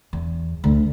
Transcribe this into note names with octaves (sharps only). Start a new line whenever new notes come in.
E2
D2